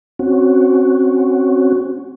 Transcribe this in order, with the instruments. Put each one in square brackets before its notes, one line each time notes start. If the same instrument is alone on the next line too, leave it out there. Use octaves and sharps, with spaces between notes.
[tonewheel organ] C4 C#4 F#4